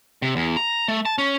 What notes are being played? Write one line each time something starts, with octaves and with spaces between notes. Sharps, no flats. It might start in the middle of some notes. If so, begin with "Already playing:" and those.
C3
E2
A#5
A3
A5
C#4